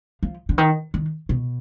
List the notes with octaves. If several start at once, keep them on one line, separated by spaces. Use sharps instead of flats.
F3
D3
D#3
D#3
B2